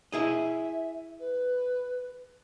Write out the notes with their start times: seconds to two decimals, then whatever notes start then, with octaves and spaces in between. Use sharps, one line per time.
0.12 E4 G#4 D#5 E5
1.19 B4